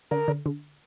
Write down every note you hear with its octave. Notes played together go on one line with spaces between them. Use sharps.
D3 A#4
D3
D3